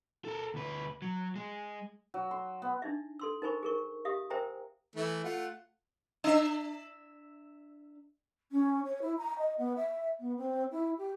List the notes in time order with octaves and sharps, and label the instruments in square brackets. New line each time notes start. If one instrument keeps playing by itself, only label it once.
[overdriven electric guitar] A4 A#4
D2 B4
F#3
G#3
[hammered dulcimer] F#3
C6
B3
[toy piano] D4 D#4 E5
A4 C6 E6
D#4 A#4 C5 G#5 B5 C#6
G#4 A#4 C#6
G4 E5 F5 D#6
A#4 C5 E5 G5 G#5 A#5
[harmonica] E3 A3 E4
A3 F4 F#5
[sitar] D4 E5
[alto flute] C#4
C#5
E4
A#5
D#5
B3
E5
B3
C4
E4
G4